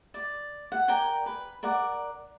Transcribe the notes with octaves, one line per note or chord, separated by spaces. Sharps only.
D5
F#5
A#4 D5 G5 G#5
B4
A#4 D5 F#5 D6